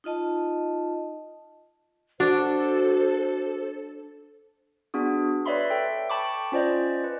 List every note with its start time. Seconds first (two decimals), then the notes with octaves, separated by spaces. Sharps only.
0.04 D#4 F4 D#5 A5
2.20 D4 F#4 A4 C5
4.94 B3 D4 F#4 G#4
5.46 B4 C#5 D5 E5 B5 C6
5.70 A4 E5 G5
6.10 G5 A5 B5 C#6 D6
6.52 C#4 F4 C5 D5 D#5
7.04 B4